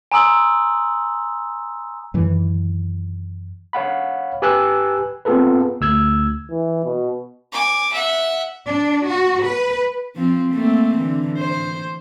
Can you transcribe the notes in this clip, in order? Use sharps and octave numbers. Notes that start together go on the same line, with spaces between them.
G#5 A#5 C6 D#6 E6 F#7
F#2 D#3 E3
C#5 F5 F#5 B5
G4 B4 G#5 E6 F#6
B3 C4 F4 G#4 A4 B4
D2 E6 G#6
E3
B2
G#5 D6
E5 F#5
D4
F#4
B4
F3 C4
A3 A#3 C4
D3 E3
C5